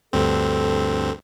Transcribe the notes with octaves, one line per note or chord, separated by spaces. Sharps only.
D2 G2 C4 A4